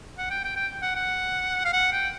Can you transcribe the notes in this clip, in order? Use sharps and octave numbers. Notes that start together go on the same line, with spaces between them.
F#5
G5
G5
G5
F#5
F#5
F5
F#5
G5